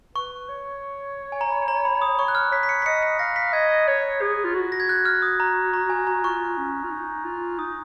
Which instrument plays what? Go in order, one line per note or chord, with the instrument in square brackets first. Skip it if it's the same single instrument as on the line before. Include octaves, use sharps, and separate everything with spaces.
[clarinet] B4 [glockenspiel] C#6
[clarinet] C#5
[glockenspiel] G#5
A#5
B5
A#5
B5
D#6
[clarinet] C#5 [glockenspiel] C#6
[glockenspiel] F#6
F6
[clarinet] C#5 [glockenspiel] B6
[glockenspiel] B6
C#7
B6
[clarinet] D#5 [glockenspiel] C#7
[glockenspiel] C#7
[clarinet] F5 [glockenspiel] A#6
[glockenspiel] B6
[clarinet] D#5 [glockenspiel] G#6
[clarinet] C#5
G#4
F4
F#4
[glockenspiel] A#6
G#6
F#6
F6
D#6
A#5
A#5
G#5
A#5
[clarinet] F4 [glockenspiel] C#6
[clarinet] C#4
F4
D#4
F4
[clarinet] D#4 [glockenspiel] D#6